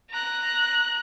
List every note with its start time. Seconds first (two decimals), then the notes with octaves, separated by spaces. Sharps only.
0.10 A#5 F#6